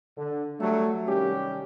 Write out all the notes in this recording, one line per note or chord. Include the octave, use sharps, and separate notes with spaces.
D3
F#3 G3 A3
C2 D#3 G3 C#4 G4